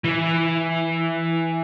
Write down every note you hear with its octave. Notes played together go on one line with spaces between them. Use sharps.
E3